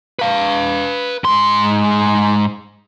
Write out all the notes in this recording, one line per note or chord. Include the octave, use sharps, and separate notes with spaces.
B4 F5
G#2 C6